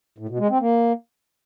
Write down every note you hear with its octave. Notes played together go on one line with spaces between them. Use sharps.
A2
B2
G#3
C4
A#3